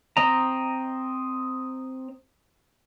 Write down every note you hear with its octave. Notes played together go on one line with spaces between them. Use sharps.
C4 D#5 A#5